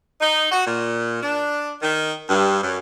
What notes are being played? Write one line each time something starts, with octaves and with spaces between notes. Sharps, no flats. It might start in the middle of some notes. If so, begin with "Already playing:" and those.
D#4
F#4
A#2
D4
D#3
G2
F#2